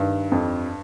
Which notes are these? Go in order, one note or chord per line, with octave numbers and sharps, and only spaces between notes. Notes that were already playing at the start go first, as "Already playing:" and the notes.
Already playing: G2 D#3
F2